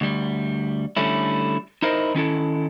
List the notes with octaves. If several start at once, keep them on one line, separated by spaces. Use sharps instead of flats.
D2 G3
D3 G3 A3 C#4 E4
D#4 E4 A#4 C5 D#5
D#3 C#4 E4 A4